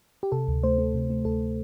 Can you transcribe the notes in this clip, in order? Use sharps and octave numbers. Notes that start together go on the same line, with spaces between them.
G4
C3 A4
D2
A3 C5
A3
C3
A3
D2 A4